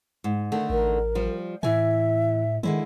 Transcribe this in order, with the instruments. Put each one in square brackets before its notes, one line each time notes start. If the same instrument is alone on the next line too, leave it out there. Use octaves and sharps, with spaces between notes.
[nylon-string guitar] G#2
D3 D#3 A3
[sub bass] A1 [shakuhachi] A#4
[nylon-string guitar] F3 G3
[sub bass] A2 [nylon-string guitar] E3 G#5 [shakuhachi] E5
[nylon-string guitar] D3 G#3 E4 [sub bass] D#3